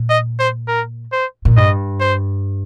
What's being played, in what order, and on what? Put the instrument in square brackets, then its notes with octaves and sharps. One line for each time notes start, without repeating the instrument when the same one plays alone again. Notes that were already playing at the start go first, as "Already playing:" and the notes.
Already playing: [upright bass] A#2
[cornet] D#5
C5
A#4
C5
[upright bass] A#2
[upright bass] G2 [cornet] D#5
[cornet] C5